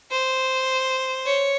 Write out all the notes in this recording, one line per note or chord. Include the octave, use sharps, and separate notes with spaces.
C5
C#5